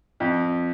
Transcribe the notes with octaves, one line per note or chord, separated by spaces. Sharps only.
F2